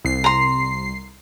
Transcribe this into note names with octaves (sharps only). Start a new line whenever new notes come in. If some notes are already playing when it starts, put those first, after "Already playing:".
C2 C7
A#5 C6